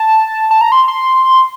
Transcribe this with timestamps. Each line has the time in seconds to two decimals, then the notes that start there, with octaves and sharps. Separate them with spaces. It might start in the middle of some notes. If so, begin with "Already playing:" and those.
Already playing: A5
0.51 A5
0.61 A#5
0.72 C6
0.88 C6